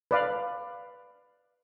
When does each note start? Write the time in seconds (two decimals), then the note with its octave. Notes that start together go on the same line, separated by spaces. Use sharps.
0.11 B4 D5 F5